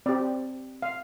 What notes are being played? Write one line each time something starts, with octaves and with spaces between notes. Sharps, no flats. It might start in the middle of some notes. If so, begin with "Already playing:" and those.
C4 G4 D5
F5